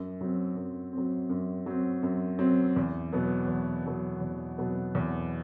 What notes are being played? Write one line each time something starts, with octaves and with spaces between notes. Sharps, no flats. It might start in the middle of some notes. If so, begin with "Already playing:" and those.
Already playing: F#2
F#3 C4
F#2
F#3 C4
F#2
F#3 C4
F#2
F#3 C4
E2
B2 F#3 B3
E2
B2 F#3 B3
E2
B2 F#3 B3
E2